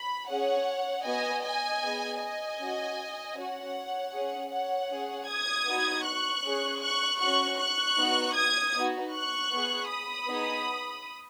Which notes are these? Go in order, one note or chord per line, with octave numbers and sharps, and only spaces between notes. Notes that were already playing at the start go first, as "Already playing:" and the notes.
Already playing: B5
C#4 G#4 C#5 F#5
B3 F#4 D#5 G#5
D#5 G#5
B3 G#4
D#5 G#5
C#4 F#4
C#4 F#4 C#5 F#5
C#4 G#4
C#5 F#5
C#4 G#4
D#6 G#6
B3 D#4 F#4
C#6 F#6
C#4 G#4
C#6 F#6
C#4 F#4 C#6 F#6
C#6 F#6
B3 D#4 F#4
D#6 G#6
B3 D#4 F#4
C#6 F#6
B3 G#4
B5 D#6
B3 D#4 G#4